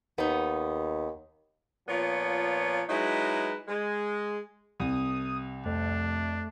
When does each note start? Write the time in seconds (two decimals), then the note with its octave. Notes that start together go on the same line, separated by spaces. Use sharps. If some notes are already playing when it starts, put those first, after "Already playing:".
0.18 D#2 B3 D#4
1.89 A#2 F3 B3 C#5
2.90 F#3 G#3 D#4 E4 B4
3.68 G#3
4.80 C2 D#6
5.66 F2 A3 D4